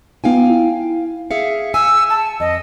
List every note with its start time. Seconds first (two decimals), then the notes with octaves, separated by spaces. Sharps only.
0.24 B3 D#4 F4 F5 G5 G#5
0.50 E4
1.31 G#4 E5 F5 C#7
1.74 G#5 E6
2.10 A5
2.40 F2 D#5